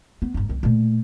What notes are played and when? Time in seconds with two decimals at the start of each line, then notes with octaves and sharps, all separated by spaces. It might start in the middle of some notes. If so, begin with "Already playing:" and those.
0.22 B3
0.34 G1 D#4
0.49 C2 F2
0.63 A#2 A3